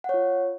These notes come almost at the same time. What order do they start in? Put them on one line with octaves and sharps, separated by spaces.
F#5 C#5 F4